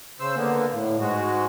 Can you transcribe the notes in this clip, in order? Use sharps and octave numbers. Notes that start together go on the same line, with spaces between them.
C#3 C5 E6
D3 A#3 B3
A2
G#2 G#3 F#4